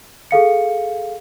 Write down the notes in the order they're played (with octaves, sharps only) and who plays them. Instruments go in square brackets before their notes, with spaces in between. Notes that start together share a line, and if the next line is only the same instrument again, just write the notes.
[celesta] G#4 A4 F5 C#7